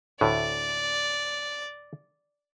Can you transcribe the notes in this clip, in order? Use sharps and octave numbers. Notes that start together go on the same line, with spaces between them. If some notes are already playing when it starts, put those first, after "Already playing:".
D2 A2 D5